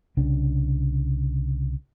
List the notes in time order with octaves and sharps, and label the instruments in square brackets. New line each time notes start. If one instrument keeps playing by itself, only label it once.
[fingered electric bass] C2 C#3 D4